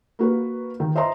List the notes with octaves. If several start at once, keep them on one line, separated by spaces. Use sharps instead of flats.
A#3 F#4 B4
D#3
C5 D#5 E5 A#5 C6